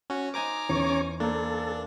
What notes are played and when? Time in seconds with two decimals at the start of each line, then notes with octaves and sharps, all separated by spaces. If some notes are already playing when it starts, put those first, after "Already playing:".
0.10 C#4 F#4
0.34 D#4 C5 G#5 A#5 D6
0.69 E2 C#4 C#5
1.20 A#3 D4 A4 C5